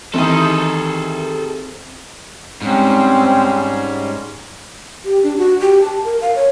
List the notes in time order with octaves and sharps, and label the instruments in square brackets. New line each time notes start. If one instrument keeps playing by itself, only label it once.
[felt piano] D#3 E3 [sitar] G3 A3 D#4 [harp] C4 [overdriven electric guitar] G#4 A4
[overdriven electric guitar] G#2 [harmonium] G3 C#4 [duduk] C4
[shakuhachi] G4
D4
F#4
G4
A5
A#4
F5
C#5